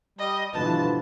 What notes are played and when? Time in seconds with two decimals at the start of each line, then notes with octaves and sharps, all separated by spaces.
0.19 G3 D#5
0.54 G2 B2 D3 E3 F3 B4 A5